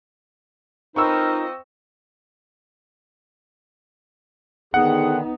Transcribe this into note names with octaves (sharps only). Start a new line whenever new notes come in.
C4 D#4 F4 A#4 B4 D#5 C#6 E6
D3 D#3 B3 D#4 G#4 F#5